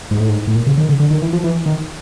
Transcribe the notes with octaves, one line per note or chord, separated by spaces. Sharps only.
G#2
A2
G#2
A2
A#2
C#3
D#3
C#3
D3
D#3
E3
F3
E3
D#3